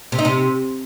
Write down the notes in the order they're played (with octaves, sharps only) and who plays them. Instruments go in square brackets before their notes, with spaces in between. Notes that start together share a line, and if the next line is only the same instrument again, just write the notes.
[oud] C3
D#4
C3